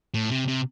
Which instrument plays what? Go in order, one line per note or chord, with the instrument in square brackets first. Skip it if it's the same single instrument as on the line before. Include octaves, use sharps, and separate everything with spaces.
[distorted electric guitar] A2
C3
C3